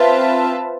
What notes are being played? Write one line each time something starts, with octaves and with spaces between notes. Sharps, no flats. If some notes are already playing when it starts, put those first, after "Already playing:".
Already playing: C4 F4 B4 E5 A5